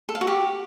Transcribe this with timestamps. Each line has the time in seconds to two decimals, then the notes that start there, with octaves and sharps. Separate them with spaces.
0.09 A4
0.15 F5
0.21 F#4
0.27 G4